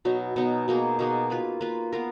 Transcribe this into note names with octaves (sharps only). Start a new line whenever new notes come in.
B2 F#3 B3 D#4
B2 F#3 B3 D#4
B2 A#3 D#4 G#4
B2 A#3 D#4 G#4
A#3 F4 B4
A#3 F4 B4
B3 F4 A#4